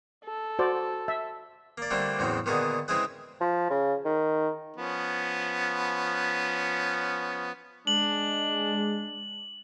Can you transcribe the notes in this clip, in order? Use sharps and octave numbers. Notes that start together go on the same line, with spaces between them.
A4
F#4 C5 D5
E5
A#3 D5
D3 G3 A3 A#3 C4 D4
E2 A2 C#3 E3 F#3 C4
A#2 D3 D#3 B3 F#4 G#4
C#3 G#3 C4 E4 G#4 B4
F3
C#3
D#3
F3 B3 C#4
G#3 D4 F#7